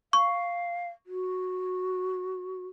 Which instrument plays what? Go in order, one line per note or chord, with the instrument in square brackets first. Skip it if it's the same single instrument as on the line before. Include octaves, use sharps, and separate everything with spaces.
[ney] F5 [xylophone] C#6
[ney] F#4